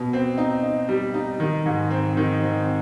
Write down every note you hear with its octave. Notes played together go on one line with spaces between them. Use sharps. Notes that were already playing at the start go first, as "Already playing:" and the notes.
Already playing: B2
C4
D#4
D#4
G3
D#4
D#3
G#2
C4
D#3
C4